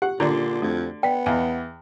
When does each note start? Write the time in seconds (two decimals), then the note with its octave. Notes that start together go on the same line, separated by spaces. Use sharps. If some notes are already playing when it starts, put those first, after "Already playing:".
0.02 G4 F#5
0.20 A#2 D3 D5 A#5
0.62 F2 A3 D4 F#4
1.03 B3 D5 G5 B6
1.26 E2 D#5 F5 G#5